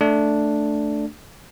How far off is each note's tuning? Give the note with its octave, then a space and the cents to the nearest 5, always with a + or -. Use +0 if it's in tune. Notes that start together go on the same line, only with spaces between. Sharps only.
A3 +0 D4 +0